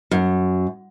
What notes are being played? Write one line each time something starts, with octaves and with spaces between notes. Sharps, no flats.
F#2